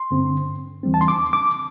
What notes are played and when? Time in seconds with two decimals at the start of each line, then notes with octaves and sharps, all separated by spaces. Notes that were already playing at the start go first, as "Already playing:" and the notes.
Already playing: C6
0.11 G2 D3 C4
0.83 E2 E3 G3 C4
0.94 A5
1.01 C6
1.08 D6
1.33 D6